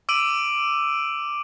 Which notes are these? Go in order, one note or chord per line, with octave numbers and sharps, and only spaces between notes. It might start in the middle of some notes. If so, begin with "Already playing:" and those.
D6 E6 D7 D#7 F#7